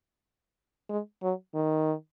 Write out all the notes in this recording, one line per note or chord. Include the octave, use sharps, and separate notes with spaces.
G#3
F#3
D#3